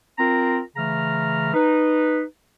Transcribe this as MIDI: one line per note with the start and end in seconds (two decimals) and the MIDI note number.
0.19 0.61 60
0.19 0.61 65
0.19 0.61 70
0.19 0.61 82
0.77 1.50 49
0.77 1.50 52
0.77 1.50 57
0.77 1.50 82
0.77 1.50 89
1.54 2.22 63
1.54 2.22 71